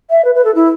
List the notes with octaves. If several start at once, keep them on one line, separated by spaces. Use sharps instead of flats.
E5
B4
B4
A4
E4